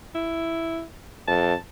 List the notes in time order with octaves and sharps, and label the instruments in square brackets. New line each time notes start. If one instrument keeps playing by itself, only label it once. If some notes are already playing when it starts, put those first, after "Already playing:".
[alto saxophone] E4
[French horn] F2 [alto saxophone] A5